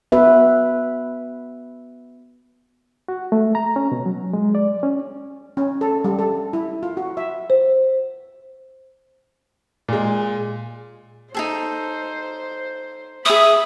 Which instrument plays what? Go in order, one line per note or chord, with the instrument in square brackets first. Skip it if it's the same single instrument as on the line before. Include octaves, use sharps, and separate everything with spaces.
[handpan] B3 F#4 B4 E5
[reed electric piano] F#4
A3
A#5
C#4
B2
F#3
G#3
D5
C#4
[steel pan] C#4
A4
G3
A4
E4
F4
F#4
E5
[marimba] C5
[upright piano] A#2 G#3
[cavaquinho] D#4 G#4 A4 [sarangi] C5
[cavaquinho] G#4 E5 [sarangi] B5 [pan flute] D#6